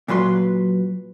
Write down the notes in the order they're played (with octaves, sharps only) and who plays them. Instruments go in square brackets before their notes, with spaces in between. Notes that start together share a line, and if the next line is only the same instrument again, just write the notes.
[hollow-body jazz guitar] A#2 F#3 B4 C6